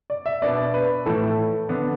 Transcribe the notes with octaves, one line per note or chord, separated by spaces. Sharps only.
D5
E5
B2 B3 D4 D5
B4
A2 E3 A3 E4 A4
D3 B3 D4